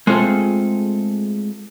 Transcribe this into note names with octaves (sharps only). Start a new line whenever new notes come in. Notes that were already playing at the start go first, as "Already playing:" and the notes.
G#3 A3 C4 F4 G#4 A4